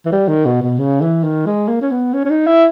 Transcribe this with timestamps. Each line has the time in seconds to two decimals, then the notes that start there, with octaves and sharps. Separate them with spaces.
0.05 E3
0.12 G3
0.28 D#3
0.45 B2
0.62 B2
0.78 C#3
1.01 E3
1.24 D#3
1.46 G#3
1.68 A#3
1.82 C#4
1.91 B3
2.13 C#4
2.25 C#4
2.30 D#4
2.47 E4